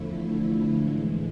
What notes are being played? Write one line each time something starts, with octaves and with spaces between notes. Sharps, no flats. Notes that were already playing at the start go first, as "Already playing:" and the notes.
Already playing: E2 D3 F3 A3 E4
A2 E3 G#3